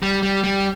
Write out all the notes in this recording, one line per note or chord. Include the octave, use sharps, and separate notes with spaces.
G3
G3
G3